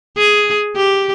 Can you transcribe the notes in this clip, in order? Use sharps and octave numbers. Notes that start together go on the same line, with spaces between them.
G#4
G4